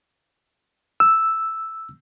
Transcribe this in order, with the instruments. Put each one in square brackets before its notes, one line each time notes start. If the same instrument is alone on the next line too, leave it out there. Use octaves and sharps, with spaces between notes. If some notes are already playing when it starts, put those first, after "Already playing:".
[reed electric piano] E6